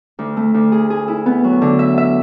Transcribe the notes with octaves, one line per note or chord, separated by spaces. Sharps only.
D2
A3
D2
G#4
G#4
E4
B3
F#3
D3
E5
E5